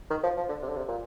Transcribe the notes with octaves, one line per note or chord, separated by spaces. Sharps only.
D#3
F3
F3
D3
C3
D3
C3
A#2